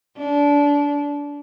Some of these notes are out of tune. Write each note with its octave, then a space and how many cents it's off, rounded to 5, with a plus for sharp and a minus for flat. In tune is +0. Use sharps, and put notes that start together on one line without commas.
D4 -25